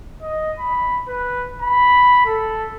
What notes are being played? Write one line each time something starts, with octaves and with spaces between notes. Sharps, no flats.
D#5
B5
B4
B5
A4